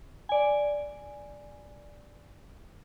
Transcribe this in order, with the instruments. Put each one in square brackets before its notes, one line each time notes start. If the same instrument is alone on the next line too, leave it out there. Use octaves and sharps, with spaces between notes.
[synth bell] D5 G#5